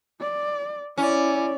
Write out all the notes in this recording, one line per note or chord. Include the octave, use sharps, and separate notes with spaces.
D5
C#4 E4 D5